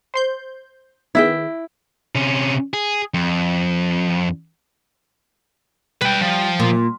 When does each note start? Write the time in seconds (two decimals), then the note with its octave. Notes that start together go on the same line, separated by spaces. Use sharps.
0.14 C5 C6 G6
1.15 D#3 B3 E4 G#4 E5 G5
2.15 C3 C#4
2.73 G#4
3.14 F2
6.01 G3 B4 G5
6.21 F3
6.60 A#2